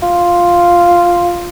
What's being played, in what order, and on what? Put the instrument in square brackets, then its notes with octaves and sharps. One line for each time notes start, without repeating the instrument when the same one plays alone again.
[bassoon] F4